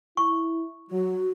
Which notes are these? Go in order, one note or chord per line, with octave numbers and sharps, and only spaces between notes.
E4 C#6
F#3 F#4